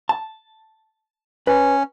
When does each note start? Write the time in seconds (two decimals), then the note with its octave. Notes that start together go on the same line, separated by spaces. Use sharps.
0.09 A5
1.47 C#4 B4